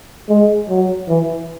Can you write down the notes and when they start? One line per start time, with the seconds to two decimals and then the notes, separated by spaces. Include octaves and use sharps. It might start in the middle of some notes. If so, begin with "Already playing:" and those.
0.29 G#3
0.69 F#3
1.08 E3